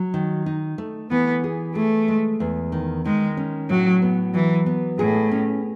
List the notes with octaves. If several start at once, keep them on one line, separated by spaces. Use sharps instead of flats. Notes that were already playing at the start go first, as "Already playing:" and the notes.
Already playing: F#3
D#3
D#4
A3
E3 B3
G#4
A3 G#4
G#3
E2
D#3
D#3 G#3
C#4
A2 F#3
B3
E3 F#3
B3
A2 G#4
C#4